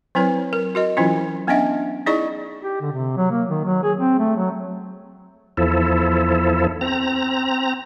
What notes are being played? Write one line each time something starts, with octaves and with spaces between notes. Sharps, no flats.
F#3 C4 E4 B4 C#5
A#4
F#4 A#4 D#5
E3 F#3 C#4 E4 F4
B3 C#4 D4 D#5 E5 F#5
D#4 E4 G#4 D5 D#5 C#6
G4
D3
C3
F#3
A#3
D#3
F#3
G#4
C4
A3
F#3
E2 F3 E4 A4
C4 A#5